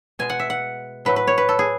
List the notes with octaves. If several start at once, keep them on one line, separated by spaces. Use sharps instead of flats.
B2 G#3 G#5
F#5
E5
F#5
A2 F#3 A3 B4
B4
C#5
B4
A4
G#4